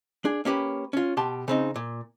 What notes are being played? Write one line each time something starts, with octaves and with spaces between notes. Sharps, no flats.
D4 G#4
A#3 C#4 G4 B4
C#4 F4
B2 G4 G5 A5 C6
C#3 C4 D#4
A#2